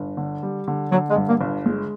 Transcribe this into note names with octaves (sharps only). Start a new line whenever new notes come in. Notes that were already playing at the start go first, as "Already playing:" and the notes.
Already playing: G1
D3
G3
D3
D3 F#3
G#3
G2
A#3
G1
G#3